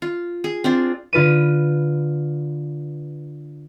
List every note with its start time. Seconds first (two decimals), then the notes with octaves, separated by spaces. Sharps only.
0.02 F4
0.44 G#4
0.64 C4 D4 F4
1.13 D3 F4 B4 D#7